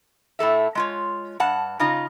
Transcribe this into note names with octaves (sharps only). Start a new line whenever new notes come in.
A2 A3 A4 E5
G#3 F4 C#5
G2 F#5 A5
C#3 D#4 F4